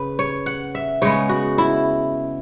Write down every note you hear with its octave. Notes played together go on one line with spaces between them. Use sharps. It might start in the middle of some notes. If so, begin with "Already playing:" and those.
Already playing: C#3 B4
C#5
F#5
E5
C#3 G#3 B3 C#5
F#4
E4